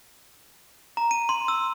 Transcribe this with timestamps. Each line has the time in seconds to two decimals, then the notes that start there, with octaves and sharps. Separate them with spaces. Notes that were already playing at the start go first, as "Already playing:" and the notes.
0.97 A#5
1.11 D#7
1.29 C6
1.48 E6